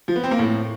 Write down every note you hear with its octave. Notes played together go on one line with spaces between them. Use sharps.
F3
B3
C4
A#3
A2